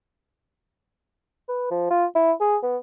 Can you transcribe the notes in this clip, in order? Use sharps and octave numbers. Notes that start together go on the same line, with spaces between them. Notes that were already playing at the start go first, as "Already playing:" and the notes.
B4
F3
F4
E4
G#4
B3